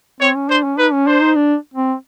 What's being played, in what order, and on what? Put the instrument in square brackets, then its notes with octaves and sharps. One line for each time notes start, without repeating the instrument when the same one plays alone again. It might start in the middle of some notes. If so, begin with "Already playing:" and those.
[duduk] C4 [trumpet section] C#5
[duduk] C#4
[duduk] D4 [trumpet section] C5
[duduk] C#4
[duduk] D#4 [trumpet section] B4
[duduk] C#4
[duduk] D4 [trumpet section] C5
[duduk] D#4
D4
C4